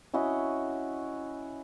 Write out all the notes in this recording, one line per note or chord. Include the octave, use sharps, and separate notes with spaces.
C#4 E4 F#4 D#5